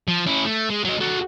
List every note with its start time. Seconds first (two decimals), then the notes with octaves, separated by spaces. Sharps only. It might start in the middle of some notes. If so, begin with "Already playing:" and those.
0.08 F3
0.27 C#4 E4
0.46 A3
0.70 G#3
0.84 F#3 D#5
1.00 F#4 A4